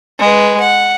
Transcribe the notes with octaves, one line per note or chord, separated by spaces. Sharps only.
G#3 B4
F#5